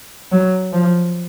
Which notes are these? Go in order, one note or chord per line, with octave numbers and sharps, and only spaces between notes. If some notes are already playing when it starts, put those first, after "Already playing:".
F#3
F3